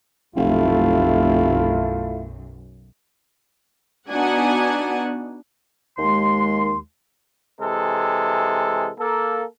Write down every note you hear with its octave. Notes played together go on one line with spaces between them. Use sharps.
F1 B1 F#2 A3 E4 F4
B3 D4 D#4 F#4 F#5 G#5
D#2 G#3 C6
C3 E3 G#3 A4
A#3 A4